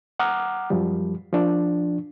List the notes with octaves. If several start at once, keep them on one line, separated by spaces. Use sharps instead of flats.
F#5 A#5 D6 D#6 F6
F#2 F3 G3
F3 D4